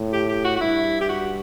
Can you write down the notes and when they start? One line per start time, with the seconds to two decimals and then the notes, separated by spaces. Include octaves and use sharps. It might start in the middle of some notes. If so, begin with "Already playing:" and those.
Already playing: A2
0.13 G4
0.29 G4
0.45 F#4
0.56 F#4
0.61 G2 E4
1.01 G4
1.09 F#4